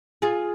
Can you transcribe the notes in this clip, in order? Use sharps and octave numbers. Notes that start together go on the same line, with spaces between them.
F4 G#4